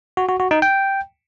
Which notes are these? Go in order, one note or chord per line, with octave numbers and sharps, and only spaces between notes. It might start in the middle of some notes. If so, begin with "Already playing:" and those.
F#4
F#4
F#4
D#4
G5